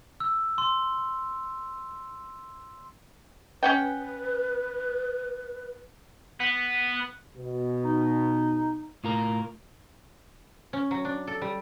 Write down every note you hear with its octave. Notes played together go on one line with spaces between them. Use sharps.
E6
C6
C#4 B4 F#5 G5
B3 F#5
B2
D#4
A2 F4 A#4
C#4
F#3
D4
A4
G3